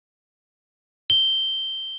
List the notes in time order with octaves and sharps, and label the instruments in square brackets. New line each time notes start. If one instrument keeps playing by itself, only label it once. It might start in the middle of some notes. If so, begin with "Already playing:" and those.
[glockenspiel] G7